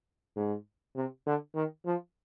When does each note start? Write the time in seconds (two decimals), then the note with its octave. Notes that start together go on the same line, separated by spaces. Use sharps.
0.36 G#2
0.96 C3
1.26 D3
1.55 D#3
1.86 F3